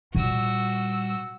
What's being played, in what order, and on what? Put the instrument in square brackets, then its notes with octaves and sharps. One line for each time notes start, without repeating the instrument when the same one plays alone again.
[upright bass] A#2 G3 [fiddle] F#4 E6